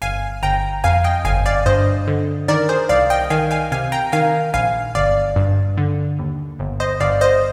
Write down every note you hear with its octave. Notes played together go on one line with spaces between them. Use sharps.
G1 F5 G#5
G1 G5 A#5
F2 F5 G#5
D#5 G5
G1 F5 G#5
D5 F5
G2 C5 D#5
D3
D#3 A#4 D5
G#4 C5
C2 D5 F5
D#5 G5
D#3 F5 G#5
F5 G#5
C3 F5 G#5
G5 A#5
D#3 F5 G#5
A#1 F5 G#5
G1 D5 F5
G2
D3
D#2
G1
C5 D#5
G1 D5 F5
C5 D#5